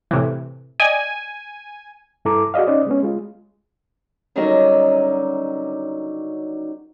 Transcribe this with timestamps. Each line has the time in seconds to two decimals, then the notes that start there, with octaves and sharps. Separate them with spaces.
0.11 A2 C3 E3
0.80 D5 D#5 G5 G#5
2.25 G2 E4 A4 A#5 D6
2.54 F#4 G#4 D5 D#5 F5
2.67 C#4 D#4 C5 D5 D#5
2.87 G#3 B3 C#4
3.03 G#3 F4
4.36 D3 D#3 F#3 G3 C#4 D#4